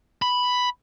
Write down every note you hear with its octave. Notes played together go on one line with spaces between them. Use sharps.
B5